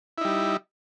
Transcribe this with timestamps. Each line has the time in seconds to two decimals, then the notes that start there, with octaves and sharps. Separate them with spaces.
0.18 E4
0.21 D#4
0.25 G3